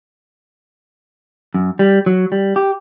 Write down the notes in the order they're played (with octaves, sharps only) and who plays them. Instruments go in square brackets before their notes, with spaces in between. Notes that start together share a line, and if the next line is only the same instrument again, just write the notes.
[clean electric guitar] F#2
G3
F#3
G3
G4